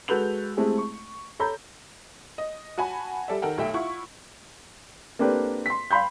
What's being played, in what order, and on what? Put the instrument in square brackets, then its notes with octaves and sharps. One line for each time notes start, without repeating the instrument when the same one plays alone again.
[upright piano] G#3 F#4 A4 B4 G6 F7
G#3 A3 C4 E4 G4 G#4
C#6
A4 C#5 A#5 B5 G6
[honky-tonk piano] D#5
F#4 F#5 G#5 A5 B5
G3 A4 D5 E5
D#3 A4 A#4 F#5 G5
B1 A3 E5 G5
E4 F4 F#5 C#6
[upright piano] A#3 C4 D4 G4 A4 B4
C6 B6
F5 G5 B5 C6 G6